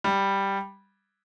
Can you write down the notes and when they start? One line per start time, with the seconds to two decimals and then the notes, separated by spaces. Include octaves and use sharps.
0.04 G3